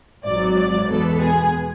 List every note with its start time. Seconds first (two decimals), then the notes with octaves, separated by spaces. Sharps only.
0.25 G#1 G#2 F#3 D5
0.57 D5
0.88 E2 B2 G#3 B3 A4
1.21 G#4